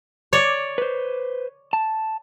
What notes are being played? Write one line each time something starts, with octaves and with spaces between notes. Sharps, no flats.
C#5 D5
B4 C5
A5